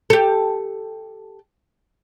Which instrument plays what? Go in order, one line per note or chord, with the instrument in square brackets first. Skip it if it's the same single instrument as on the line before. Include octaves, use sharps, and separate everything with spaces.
[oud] G4 A4